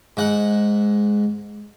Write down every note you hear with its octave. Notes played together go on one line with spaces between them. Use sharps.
G#2 F#5